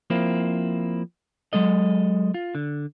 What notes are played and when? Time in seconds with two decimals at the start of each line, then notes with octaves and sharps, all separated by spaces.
0.10 F3 A#3 C4 E4
1.53 F#3 G#3 A4 D#5
2.34 F4
2.55 D3